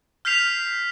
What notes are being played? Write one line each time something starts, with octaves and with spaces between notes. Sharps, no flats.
F6 G6 B6 C7 F7